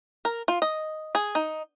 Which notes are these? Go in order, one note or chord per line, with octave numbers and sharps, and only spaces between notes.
A#4
F4
D#5
G#4
D#4